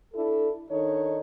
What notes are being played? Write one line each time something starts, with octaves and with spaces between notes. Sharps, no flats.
D4 E4 A4
D#3 D4 D#4 A4 C#5